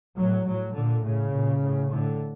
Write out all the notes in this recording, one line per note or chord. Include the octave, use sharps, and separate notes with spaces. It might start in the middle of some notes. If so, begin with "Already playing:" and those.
A2 F#3
A2 F#3
A#2 D3
A2 C#3
A#2
A2
A2 D3